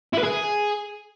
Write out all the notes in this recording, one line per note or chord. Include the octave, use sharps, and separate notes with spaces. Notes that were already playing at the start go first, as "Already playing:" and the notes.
E4
B4
G#4